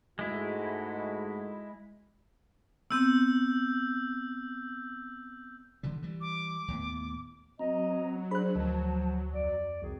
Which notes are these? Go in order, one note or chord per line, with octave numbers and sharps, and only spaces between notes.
G#2 G#3 A3 E4 F#4
B3 C4 E6 G6
D3 E3 G3
E3 G3
D6
D#2 A2 B3
F#3 C4 D#5 A#5
G3 D4 G#4 C5 B5 F#6
D2 F3 A5
F2 D5
C2 D#3 F#4 G#4